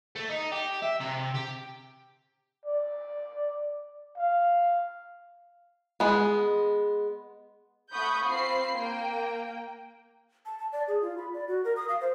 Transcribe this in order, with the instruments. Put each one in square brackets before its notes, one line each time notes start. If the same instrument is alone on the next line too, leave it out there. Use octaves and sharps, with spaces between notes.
[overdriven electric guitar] A3
D#4
G4
E5
C3
G4
[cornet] D5
F5
[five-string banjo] G#3 B3
[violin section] A3 F#5 B5 C#6 D#6 G6
C4 F4 B5 C7
A#3 G5
[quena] A5
A5
D5
G#4
F4
B5
D5
F#4
A#4
D#6
F5
C5